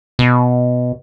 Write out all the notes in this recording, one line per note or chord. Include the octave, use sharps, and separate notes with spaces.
B2